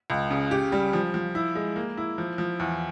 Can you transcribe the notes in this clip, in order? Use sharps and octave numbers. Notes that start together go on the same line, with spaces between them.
C#2
C#3
G4
G3
F3
F3
E4
G#3
A#3
E4
F3
F3
E2